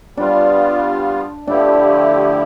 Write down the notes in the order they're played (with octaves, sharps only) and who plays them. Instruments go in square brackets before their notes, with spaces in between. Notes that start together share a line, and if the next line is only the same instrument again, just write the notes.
[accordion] G3 B3 F4 [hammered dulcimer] D4
[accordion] D3 F3 A3 E4 G4 [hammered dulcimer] D4